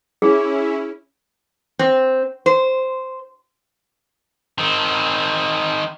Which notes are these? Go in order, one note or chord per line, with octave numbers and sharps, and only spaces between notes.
C#4 E4 G#4
C4
C5
D#3 C4